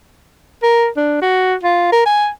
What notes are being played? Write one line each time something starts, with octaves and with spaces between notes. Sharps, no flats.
A#4
D4
F#4
F4
A#4
G#5